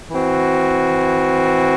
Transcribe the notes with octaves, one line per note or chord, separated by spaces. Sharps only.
E3 C4 F#4